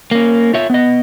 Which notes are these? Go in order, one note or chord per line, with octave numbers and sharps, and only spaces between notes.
A#3 C#4
F4 C#5 E5
B3 D#5